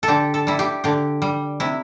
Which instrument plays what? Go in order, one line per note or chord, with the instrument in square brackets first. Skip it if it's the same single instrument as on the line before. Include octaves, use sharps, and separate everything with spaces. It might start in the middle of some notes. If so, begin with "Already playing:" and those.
[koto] A4
D3 G4
A4
G3 E4
G4
D3 G4
G3
C3 E4